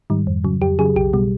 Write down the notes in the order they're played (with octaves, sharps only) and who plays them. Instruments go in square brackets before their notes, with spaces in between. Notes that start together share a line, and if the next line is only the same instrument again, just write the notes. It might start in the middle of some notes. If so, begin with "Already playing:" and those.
[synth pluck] G#2 D#3 G3
F2
C#3 F#3
F2 G4
C#3 F#3 G#4
B1 G4
B2 G3